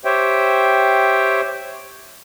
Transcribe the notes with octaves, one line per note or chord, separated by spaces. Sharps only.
G4 C5 C#5 E5 G5